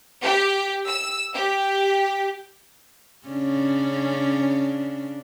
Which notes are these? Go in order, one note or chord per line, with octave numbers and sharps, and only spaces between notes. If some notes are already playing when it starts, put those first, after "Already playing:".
G4
E6
G4
C#3 C#4 D4